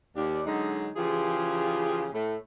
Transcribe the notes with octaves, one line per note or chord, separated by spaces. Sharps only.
D#2 D5
D3 F#3 G#3 D#4
C#3 E3 F3 F4 G4 G#4
A2 A3